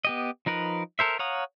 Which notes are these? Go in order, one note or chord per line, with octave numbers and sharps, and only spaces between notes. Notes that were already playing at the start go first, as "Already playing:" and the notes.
B3 G4 D#5
F3 D#4 A#4 B4
A4 A#4 C5 E5
C#5 F5 F#5 A#5 D#6